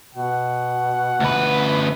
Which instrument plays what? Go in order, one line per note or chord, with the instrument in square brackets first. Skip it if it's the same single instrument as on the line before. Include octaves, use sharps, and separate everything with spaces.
[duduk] B2 [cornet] F#5
[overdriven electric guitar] D2 B4